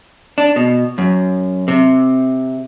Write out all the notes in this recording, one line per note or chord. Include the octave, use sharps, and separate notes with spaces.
D4
B2
F#2
C3